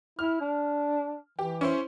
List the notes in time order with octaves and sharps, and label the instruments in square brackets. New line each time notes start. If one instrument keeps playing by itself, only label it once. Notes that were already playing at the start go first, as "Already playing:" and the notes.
[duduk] E4 [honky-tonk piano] F6
[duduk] D4
[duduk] E3 [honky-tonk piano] G4
[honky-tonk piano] C#4 E4 C5